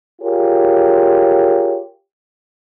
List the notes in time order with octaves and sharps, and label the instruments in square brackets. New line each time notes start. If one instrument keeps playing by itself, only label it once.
[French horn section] F4 G4 G#4 A#4 C#5